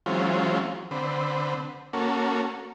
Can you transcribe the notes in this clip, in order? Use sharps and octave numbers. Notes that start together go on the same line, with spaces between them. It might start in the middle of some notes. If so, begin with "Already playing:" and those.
E3 F#3 G#3 C4 C#4 F4
D3 C4 B4
A#3 C#4 F#4 A4